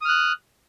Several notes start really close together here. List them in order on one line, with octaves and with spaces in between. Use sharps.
D#6 F6 F#6